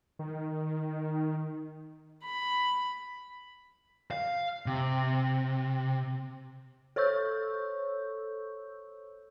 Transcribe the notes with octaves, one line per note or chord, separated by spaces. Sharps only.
D#3
B5
F5
C3
A4 C5 C#5 C#6 E6 G6